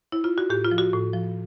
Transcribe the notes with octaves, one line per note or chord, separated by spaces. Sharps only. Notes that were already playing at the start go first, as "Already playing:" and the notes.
E4
F4
F#4
A2 G4
F4
F3
F#4
A2
F3